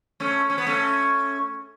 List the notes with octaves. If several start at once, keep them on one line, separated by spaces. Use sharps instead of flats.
A3 C#4
C#4
B3
A3 C#4